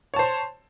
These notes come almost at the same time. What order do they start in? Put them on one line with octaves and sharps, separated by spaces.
C#5 A5 C5 C6